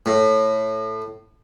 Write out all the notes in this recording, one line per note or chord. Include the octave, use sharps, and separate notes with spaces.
A2